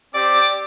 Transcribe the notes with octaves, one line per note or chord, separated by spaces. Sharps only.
C4 G4 D5 D6